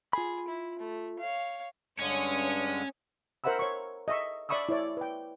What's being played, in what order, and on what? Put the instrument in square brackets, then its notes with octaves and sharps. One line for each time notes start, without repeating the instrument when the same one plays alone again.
[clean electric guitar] F4 B5 [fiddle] G#4
[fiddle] E4
A3
C#5 F5
[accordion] G2 D3 G#3 [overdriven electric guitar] C#4 [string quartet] C#5 D#6
[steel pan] A#4 C5 E5 F#5 B5 E6
C#5 C#6
D#5 E5 C#6
D5 E5 B5 C#6 D#6 E6
E4 C#5 D5
B4 G5